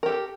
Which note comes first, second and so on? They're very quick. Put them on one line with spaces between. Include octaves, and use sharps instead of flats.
A#4 G4 A4